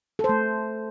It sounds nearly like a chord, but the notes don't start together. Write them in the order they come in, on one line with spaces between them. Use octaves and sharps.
A4 C5 A3